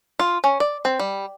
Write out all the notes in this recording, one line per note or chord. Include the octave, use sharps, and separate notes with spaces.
F4
C#4
D5
C4
G3